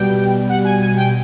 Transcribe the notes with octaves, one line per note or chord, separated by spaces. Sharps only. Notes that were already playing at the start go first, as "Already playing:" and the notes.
Already playing: B2 G3 G5
F#5
G#5
G#5
G5